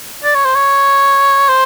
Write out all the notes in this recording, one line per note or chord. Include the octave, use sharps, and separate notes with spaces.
D5
C#5
C5
C#5
C5